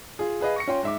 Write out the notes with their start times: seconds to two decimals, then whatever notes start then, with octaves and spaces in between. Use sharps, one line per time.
0.19 F4 G#4
0.41 G#4 B4 D#5 F5
0.56 C#6 A#6 C#7
0.67 C#4 F4 C#5 G5 C6
0.83 G#2 E5 D6